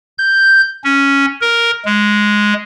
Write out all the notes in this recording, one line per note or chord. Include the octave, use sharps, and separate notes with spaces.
G6
C#4
A#4
G#3